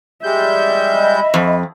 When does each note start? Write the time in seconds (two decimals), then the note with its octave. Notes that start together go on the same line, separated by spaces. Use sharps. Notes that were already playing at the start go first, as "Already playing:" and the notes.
0.24 G3 G#3 E5 G6
0.95 D#5 B5
1.34 F2